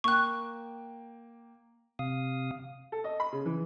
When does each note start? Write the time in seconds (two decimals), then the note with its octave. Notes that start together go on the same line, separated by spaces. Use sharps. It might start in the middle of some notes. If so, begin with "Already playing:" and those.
0.04 A#3 G5 C#6 F#6
1.99 C3 F5 D#6
2.92 A4
3.04 D#5
3.20 B5
3.33 C#3
3.46 E3